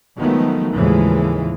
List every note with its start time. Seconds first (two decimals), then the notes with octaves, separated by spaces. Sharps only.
0.17 D#3 F3 F#3 G#3 A3 B3
0.75 D#2 A2 C#3 E3 F3 G#3